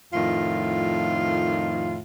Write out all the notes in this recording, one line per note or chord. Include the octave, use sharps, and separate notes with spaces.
F2 A2 D#3 F4